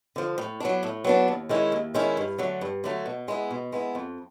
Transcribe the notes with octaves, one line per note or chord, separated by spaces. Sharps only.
D3 F3
A2
F#3 B3 D4
A2
F#3 B3 D4
D#2
D#3 G#3 C#4 E4
D#2
D#3 G#3 C#4 E4
G2
D3 F#3 A3
G2
D3 F#3 A3
B2
G#3 B3 E4
B2
G#3 B3 E4
F2